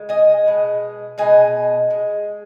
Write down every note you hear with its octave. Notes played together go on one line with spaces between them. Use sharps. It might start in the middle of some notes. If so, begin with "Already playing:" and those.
Already playing: C#3 G#3
D#5 G#5
B2 G#3
B2 G#3 D#5 G#5
G#3